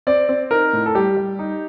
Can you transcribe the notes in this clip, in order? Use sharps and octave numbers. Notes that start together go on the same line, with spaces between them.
C4 D5
C4
D#4 A#4
A2
A4
G3 G4
G3
D#4